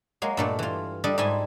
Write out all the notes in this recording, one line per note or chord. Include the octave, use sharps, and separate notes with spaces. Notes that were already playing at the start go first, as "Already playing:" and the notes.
F#3 G#3 A#3
G2 A#2 A3
E3 F4
G3 D4 A4 D#5
G#2 G3 E4 G#5 C6